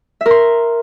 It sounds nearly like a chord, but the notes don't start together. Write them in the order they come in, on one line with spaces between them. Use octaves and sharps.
E5 A#4 C6